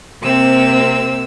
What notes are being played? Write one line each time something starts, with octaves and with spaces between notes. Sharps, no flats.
C3 A#3 C4 E6